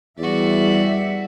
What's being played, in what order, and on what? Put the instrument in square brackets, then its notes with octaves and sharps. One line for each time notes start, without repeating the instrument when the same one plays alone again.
[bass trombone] E2 [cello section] G3 E5 [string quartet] F#4 D5